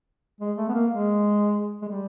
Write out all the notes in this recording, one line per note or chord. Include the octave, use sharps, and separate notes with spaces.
G#3
A3
B3
A#3
G#3
G#3
G3